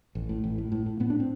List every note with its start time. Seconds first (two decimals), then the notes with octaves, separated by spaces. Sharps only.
0.15 A1
0.29 A2
0.44 A1
0.58 A2
0.72 A2
0.86 A2
1.00 A2 B3
1.10 D4
1.20 C4